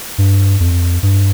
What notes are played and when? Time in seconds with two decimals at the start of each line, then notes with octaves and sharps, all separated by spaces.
0.18 G2
0.60 F2
1.03 G2